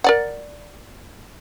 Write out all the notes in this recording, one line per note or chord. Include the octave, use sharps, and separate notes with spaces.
A#4 D5 F#5